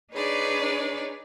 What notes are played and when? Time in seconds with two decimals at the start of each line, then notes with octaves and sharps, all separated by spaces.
0.14 D4 D#4 G#4 B4 C#5 D5